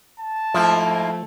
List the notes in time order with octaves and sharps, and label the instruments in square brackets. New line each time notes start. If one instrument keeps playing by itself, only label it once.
[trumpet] A5
[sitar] G#2 A#3 E4 [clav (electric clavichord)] F3 [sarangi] A3